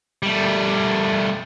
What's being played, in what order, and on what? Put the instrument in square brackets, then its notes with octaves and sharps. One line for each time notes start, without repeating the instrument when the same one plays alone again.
[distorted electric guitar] G3 A3